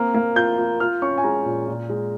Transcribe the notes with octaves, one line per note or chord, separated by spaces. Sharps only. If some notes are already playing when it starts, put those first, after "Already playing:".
Already playing: A#3 C4
A#3
F4 G6
F4
F4 F6
C#4 C#6
G#5
G#3 A#5
A#2
A#2
G#3